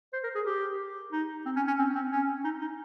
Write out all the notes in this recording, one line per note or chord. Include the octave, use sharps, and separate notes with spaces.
C5
A#4
G#4
G4
D#4
C4
C#4
C#4
C4
C4
C#4
D#4
D#4